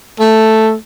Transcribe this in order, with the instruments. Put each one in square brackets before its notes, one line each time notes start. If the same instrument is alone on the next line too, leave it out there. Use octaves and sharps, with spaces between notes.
[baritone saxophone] A3 [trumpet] A4